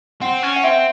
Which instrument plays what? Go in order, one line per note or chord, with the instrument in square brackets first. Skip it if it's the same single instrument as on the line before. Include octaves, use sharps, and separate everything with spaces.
[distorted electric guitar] C4 [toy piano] F#5
[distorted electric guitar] C#4
[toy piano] F#5
[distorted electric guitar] C4 [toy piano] E5